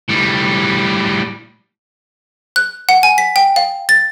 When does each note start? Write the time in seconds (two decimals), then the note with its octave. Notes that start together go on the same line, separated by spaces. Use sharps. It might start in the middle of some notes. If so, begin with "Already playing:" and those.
0.09 A2 G3
2.56 F#6
2.89 F#5
3.03 G#5
3.18 B6
3.36 G5
3.56 F5
3.89 A6